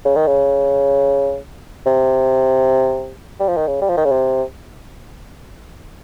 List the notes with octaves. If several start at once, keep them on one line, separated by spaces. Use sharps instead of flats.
C#3
D#3
C#3
C3
G3
F3
D#3
C#3
G3
F3
D#3
C#3
C3